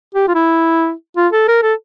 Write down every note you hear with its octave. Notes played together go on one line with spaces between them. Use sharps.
G4
F4
E4
F4
A4
A#4
A4